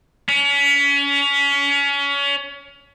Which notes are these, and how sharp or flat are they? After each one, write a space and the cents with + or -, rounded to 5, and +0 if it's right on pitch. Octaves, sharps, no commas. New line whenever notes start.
C#4 +30